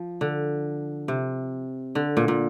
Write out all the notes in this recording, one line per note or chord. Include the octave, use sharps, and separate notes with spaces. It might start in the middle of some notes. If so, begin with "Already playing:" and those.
Already playing: F3
D3
C3
D3
A#2
A#2